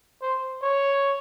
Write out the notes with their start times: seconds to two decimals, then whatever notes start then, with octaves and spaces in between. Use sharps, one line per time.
0.22 C5
0.63 C#5